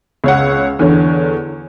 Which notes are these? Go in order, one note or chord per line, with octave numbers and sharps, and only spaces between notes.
C#2 C#5 F#5
E2 D3 C#5